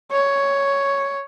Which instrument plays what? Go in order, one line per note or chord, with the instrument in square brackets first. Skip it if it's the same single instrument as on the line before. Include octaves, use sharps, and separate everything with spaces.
[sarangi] C#5